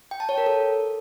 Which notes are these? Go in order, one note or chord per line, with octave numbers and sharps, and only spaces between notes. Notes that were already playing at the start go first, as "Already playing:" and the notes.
G5
A5
C#5
A#4
A4